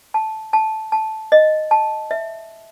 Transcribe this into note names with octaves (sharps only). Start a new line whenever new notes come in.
A5
A5
A5
D#5
A5
E5